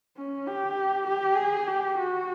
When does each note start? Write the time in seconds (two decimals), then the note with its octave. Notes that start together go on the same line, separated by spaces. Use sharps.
0.17 C#4
0.47 G4
1.07 G4
1.37 G#4
1.68 G4
1.98 F#4